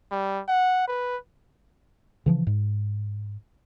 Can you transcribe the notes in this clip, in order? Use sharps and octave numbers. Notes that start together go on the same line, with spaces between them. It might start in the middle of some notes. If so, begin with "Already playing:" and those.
G3
F#5
B4
C#3 E3 F3
G#2